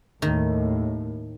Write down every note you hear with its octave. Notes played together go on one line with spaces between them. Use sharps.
D#2 A2 D#3